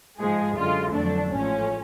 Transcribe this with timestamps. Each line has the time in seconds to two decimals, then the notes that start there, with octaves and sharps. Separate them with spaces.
0.18 G#2 F3 G#3 G#4
0.57 F#2 D3 G#3 F4
0.93 F2 D3 F#3 A3 D4
1.32 A1 G#2 F3 A3 C#4